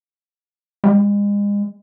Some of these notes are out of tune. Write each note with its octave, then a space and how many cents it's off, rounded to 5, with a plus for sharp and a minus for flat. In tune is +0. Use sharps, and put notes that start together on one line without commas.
G#3 -35